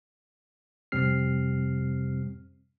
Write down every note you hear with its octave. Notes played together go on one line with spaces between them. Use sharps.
F2 C3 G3 C4 F6 C7